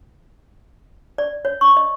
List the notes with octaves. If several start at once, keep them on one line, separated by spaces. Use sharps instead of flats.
D5
C#5
C#6
D#5